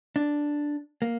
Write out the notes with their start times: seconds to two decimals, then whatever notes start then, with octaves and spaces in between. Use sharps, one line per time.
0.16 D4
1.02 A#3